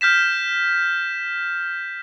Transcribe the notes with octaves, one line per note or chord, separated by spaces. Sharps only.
F6 G6 B6 E7